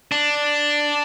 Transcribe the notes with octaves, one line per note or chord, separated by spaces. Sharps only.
D4